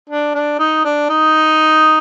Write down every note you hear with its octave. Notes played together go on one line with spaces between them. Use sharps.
D4
D4
D#4
D4
D#4